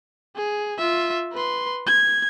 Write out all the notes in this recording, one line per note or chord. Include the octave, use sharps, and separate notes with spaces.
G#4
F4 E5
B4 C6
G#6